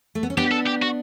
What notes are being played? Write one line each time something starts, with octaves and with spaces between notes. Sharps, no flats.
A3
B3
C#4
B3 D4 G4
A4
G4
F#4